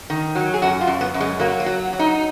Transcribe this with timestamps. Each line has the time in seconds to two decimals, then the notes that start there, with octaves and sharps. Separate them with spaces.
0.10 D#3
0.35 F#3
0.54 G#4
0.62 F#2 F#4
0.81 F4
0.88 F#2
1.01 B3
1.14 F#2
1.20 G#3
1.40 F#3 A#3
1.60 A#3
1.66 F#3
1.93 F#3
1.99 D#4